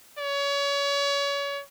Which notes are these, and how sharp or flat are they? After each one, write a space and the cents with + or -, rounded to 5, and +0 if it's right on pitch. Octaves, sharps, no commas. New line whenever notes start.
C#5 +30